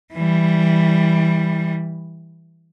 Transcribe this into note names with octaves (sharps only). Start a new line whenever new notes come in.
E3 G3